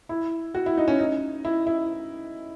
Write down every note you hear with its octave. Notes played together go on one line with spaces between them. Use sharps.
E4
F#4
E4
D#4
C#4
D#4
E4
E4